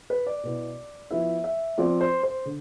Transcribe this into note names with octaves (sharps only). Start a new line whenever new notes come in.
B4
D5
B2 B3 E4
F3 B3 E4 E5
E5
F3 C4 F4 D5
C5
C5
D3